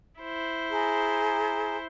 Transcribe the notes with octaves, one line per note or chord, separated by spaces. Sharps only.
E4 C5
G#4 G#5 A#5